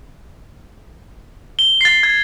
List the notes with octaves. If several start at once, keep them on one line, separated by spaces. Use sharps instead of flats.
G7
A6 C7
G#6